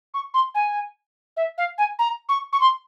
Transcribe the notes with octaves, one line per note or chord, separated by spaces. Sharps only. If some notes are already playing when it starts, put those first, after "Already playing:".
C#6
C6
G#5
E5
F5
G#5
A#5
C#6
C#6
C6